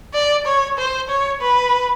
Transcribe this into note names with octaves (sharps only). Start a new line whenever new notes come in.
D5
C#5
C5
C#5
B4